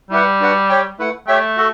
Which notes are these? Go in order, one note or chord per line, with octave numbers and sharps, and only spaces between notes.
G3 E4 G4 B4 F#5
D4 F#4 B4 D5 F#5
G4 C#5 G5
A3 E4 B4 F#5
A3 G4 C#5 E5 G5
F#4 A4